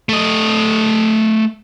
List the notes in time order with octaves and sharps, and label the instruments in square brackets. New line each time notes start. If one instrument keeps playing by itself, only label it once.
[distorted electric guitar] A3 D#5